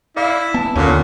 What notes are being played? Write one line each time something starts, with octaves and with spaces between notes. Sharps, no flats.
E4 D5 F5
B3 A5
D#2 A#2 D3 C#4